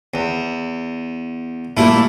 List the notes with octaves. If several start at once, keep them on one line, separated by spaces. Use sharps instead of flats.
E2
A#2 G3 A3 A#3 E4